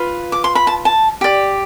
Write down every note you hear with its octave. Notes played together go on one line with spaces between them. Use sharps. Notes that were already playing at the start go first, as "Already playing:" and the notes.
Already playing: F4 B4
D6
C6
B5
A5
A5
G4 D5